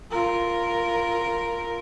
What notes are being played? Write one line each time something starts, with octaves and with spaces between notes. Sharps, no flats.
F4 A#4